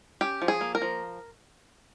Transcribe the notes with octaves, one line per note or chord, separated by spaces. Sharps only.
C#4 G4
F3
G#4
A#3
A#4
F3